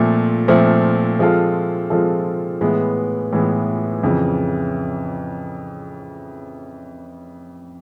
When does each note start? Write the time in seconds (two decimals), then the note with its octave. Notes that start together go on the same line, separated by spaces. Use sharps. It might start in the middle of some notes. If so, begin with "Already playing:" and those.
Already playing: A#2 F3 A3 C4
0.48 A#2 F3 A3 C4
1.19 F3 G#3 C4 F4 A4
1.90 F3 G#3 C4 F4 A4
2.61 A2 E3 G#3 B3
3.32 A2 E3 G#3 B3
4.03 F2 C#3 E3